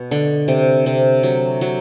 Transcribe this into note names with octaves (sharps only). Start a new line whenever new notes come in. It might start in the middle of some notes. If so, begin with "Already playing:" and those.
Already playing: B2 F#4
D3
C3
C3
F#3
F#3